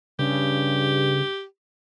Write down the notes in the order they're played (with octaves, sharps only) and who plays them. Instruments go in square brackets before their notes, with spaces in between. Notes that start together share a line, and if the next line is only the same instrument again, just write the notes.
[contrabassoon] G2 [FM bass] C#3 [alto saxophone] G4